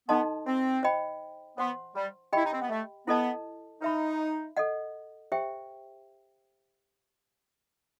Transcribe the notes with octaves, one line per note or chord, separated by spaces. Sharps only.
B3 D#4 A4 D#5 A5 C6
C4
C5 D#5 G5 B5
B3 C5 F#5 C6
G3
E4 G4 D#5 G5 B5
D#4
C4
B3
A3
B3 E4 A4 D#5 A5
D#4 B4 E5 B5
A4 D#5 F#5
G4 C5 E5 G5